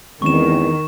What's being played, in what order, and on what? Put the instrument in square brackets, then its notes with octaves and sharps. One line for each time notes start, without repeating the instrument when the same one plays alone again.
[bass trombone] E2 [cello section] D#3 [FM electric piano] G#3 C4 C#4 [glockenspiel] C#6 E7